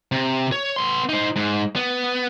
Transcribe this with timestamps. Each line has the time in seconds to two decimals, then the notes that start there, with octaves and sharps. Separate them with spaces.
0.12 C3
0.52 C#5
0.76 B3 C6
1.09 D#4 C5
1.36 G#2
1.76 B3